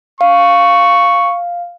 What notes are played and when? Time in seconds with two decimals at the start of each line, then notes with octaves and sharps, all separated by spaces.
0.21 F5 C#6